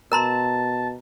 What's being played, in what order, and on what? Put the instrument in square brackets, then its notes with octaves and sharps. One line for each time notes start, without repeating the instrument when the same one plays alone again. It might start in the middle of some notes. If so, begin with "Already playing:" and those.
[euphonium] B2 [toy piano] A#4 A#5 C6 [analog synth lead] A5